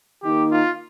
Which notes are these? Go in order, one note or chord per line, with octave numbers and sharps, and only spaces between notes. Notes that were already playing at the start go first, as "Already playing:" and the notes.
D#3 A#3 D#4 G4
F4